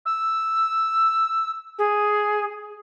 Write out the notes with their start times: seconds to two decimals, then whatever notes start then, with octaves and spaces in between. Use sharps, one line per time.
0.05 E6
1.78 G#4